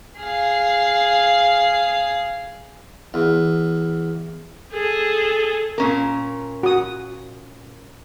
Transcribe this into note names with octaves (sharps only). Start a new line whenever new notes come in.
G#4 F5
E2
G#4 A4
A#2 C#4 A#4
F#4 D#6